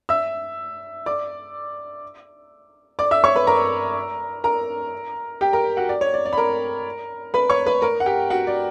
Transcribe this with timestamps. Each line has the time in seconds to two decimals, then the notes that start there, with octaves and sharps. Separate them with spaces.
0.09 E5 E6
1.06 D5 D6
2.99 D5 D6
3.11 E5 E6
3.24 C#5 C#6
3.36 B4 B5
3.47 A#4 A#5
4.44 A#4 A#5
5.41 G4 G5
5.53 A#4 A#5
5.77 F#4 F#5
5.89 D5
6.01 C#5
6.14 D5
6.26 D5
6.33 B5
6.37 A#4 A#5
7.34 B4 B5
7.50 C#5 C#6
7.66 B4 B5
7.82 A#4 A#5
8.00 F#5
8.06 G4 G5
8.30 F#4 F#5
8.47 D5